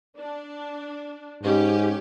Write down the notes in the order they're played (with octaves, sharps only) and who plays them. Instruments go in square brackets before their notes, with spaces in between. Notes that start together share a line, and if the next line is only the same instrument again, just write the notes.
[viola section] D4
[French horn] G#2 [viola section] C#4 G4